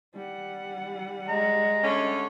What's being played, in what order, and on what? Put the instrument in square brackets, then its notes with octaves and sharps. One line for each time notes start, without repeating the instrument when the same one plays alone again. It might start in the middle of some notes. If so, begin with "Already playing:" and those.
[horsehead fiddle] G3 F#5
[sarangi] G#3 [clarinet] A#5
[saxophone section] D3 A3 C#4